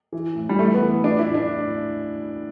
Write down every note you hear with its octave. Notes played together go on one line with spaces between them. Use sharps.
E3
A2
G3
E3 A3
B3
E3
A2 D4
E4
A2
D4